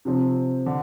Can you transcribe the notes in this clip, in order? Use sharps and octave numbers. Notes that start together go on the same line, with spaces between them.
C3 F3 C4
D3